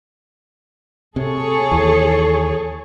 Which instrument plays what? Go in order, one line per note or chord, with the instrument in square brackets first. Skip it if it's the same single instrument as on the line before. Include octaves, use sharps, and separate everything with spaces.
[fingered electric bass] C3 [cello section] G#4 A4 C#5
[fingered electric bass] D#2 E3